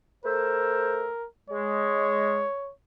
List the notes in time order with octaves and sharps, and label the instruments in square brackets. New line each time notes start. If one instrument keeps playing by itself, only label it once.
[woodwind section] A3 C5 E6 [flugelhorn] A#4
[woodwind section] G#3 [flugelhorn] C#5